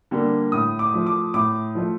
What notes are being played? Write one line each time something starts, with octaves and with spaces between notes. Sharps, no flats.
D3 G3 A#3
A2 D#6
D6
F3 A3
D6
A2 D6
F3 A3